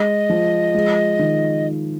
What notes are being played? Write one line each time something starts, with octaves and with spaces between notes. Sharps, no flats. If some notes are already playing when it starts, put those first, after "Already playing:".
Already playing: G#3 D#5
F3
G#3
D#3